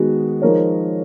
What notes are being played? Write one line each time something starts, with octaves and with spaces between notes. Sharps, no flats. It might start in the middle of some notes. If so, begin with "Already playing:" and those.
Already playing: D#3 G#3 B3 F#4
F3 G#3 D#4 A#4 C#5